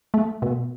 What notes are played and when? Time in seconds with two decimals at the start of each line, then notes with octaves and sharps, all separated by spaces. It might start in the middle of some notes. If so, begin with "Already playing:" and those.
0.14 A3
0.42 B2